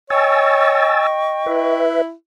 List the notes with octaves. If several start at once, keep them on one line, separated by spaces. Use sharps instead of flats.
C#5 D#5 G5 G#5 C#6 E6 A6
E4 B4 E5